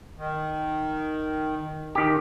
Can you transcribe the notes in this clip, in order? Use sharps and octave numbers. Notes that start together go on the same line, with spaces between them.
D#3
D#3 G4